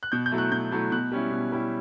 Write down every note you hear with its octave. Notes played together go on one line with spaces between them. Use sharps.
F#6
B2 G6
G6
F#3 A3 E4
F#6
B2 G6
F#3 A3 E4
B2 F#6
G3 C#4 E4
B2
G3 C#4 E4